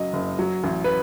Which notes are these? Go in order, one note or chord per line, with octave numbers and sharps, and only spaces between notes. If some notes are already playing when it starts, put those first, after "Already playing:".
Already playing: F#1 F#2 F#3 D#5
F#1
F#3
A1
B4